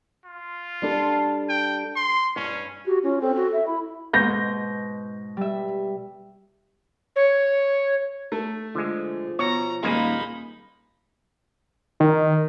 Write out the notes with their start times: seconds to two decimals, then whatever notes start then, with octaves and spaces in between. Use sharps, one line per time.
0.25 F4
0.82 G3 D4 A4
1.49 G5
1.96 C6
2.36 G2 C#4
2.86 F#4 G4
3.03 C#4 F4
3.21 C4 A4
3.36 F#4
3.53 E5
3.67 E4 B5
4.13 G#2 B2 G6 A#6
5.37 G3 E5
7.16 C#5
8.32 A3
8.75 D3 F3 G#3
9.39 B2 C#5 A#5
9.83 D#1 G#3 A#3 D#4 F4 G#4 B5
12.00 D#3